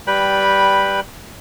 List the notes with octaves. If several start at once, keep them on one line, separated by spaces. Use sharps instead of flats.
G3 B4 G5 B5